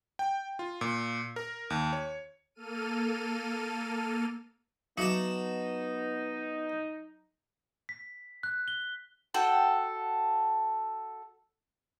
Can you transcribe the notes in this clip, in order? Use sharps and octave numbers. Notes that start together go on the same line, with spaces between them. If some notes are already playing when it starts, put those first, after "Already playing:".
G5
F4
A#2
A#4
D#2
C#5
A#3 A4 F6 D#7
F#3 B3 D#4 F#4 F5 A5 D6
B6
F#6
G7
F#4 A4 G5